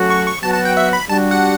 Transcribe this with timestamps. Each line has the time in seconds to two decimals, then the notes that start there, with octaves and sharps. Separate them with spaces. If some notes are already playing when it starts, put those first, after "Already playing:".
Already playing: F#3 A3 C#4 F#4 A4
0.10 C#6
0.27 C#6
0.43 F#3 B3 F#4 A5
0.54 A5
0.65 G5
0.77 E5
0.93 B5
1.09 G3 D4 F#4 A5
1.31 F#5